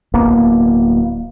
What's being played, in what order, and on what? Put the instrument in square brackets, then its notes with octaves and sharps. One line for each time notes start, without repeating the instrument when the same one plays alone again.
[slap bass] D1 A#3 B3